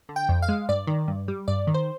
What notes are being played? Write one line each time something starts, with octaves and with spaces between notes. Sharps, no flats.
D3
G5
F2
F5
G#3
G2 D5
D#3
G2
G3
G2 D5
D#3
C5